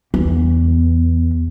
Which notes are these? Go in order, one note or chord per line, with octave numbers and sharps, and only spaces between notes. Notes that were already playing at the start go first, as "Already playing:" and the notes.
E2